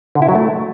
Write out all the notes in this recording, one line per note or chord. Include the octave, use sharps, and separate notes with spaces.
D3
E4
F#3
A3